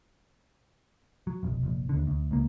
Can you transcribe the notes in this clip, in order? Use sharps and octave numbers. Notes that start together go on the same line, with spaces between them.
F#3
F1 B1
F1 A#1
D#2 D3
D2
C#2 A#3